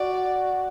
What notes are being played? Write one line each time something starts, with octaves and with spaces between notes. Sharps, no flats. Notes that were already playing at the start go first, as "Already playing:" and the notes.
Already playing: F#4 D5